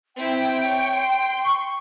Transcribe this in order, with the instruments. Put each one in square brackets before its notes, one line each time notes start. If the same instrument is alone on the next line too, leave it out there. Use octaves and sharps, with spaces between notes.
[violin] C4 E4 [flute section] G5
[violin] C#5
C6
[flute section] C#6